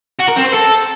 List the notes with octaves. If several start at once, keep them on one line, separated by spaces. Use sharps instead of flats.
F#4
A#4
C4
C5
A4